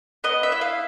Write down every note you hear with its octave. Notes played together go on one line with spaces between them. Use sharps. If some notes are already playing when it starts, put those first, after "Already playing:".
B3 D#5
E5
E4
F5